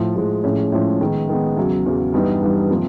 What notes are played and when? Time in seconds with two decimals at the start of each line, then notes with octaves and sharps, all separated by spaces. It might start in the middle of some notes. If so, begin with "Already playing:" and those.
Already playing: A2 F3
0.15 A2 F3 G#3
0.44 A2 F3 G#3 C#4
0.72 A2 F3 G#3 C#4
1.00 D#3 G#3 B3
1.29 D#3 G#3 B3
1.57 E2 C#3 F#3
1.86 E2 C#3 F#3
2.14 G2 E3 G3 B3 D#4
2.42 G2 E3 G3 B3 D#4
2.70 C3 F3 A#3